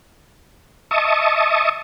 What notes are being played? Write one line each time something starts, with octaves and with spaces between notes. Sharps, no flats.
D#5 E5 A5 C#6 D#6